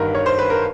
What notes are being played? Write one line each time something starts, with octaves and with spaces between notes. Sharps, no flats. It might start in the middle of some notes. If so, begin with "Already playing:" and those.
Already playing: G1 G2 D#3 A#4 B4
C#5
C5
B4
A#4